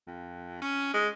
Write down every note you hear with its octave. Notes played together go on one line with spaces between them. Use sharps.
F2
C#4
G#3